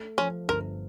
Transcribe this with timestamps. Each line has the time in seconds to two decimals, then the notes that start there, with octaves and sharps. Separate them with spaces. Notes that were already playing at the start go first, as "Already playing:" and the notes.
Already playing: A3
0.18 F3 C#4
0.48 G1 A#4